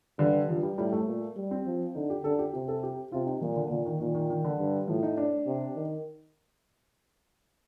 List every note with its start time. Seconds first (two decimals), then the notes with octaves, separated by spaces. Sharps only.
0.19 G2 D3
0.49 G2 F3
0.63 G3
0.77 A2 G3
0.92 A3
1.06 A#2
1.36 G3
1.51 C4
1.66 F3
1.95 D3 D#4
2.10 G4
2.24 D3 A4
2.39 G4
2.53 C3 G4
2.68 A4
2.83 G4
3.12 C3 F4
3.27 D#4
3.41 A#2 F3
3.56 D3
3.70 A#2 D3
3.86 D#3
4.00 A#2 D#3
4.14 D#3
4.30 D#3
4.44 D3
4.59 G2
4.88 A2 F3
5.03 D#4
5.17 D4
5.47 C3
5.76 D#3